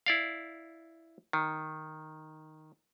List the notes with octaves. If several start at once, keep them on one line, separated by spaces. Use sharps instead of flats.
E4 D5 F5
D#3